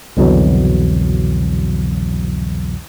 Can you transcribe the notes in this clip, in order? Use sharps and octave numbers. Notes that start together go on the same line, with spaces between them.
C2 F2 B2 D3 E3 F#3